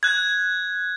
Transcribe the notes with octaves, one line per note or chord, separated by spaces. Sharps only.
F#6 G#6